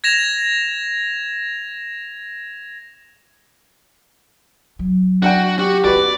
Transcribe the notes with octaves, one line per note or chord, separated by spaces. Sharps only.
G#6 A#6 E7 F7
F#3
D4 F#4 F#5 G5
F#4 G4
B3 C#4 F#4 B4 D5